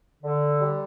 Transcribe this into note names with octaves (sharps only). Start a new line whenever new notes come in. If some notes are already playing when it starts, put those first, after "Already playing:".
D3
G3